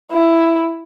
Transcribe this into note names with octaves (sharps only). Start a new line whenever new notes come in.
E4